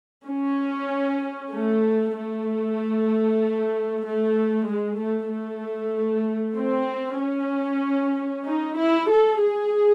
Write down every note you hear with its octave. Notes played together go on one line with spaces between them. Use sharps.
C#4
A3
A3
A3
G#3
A3
A3
C4
C#4
D#4
E4
A4
G#4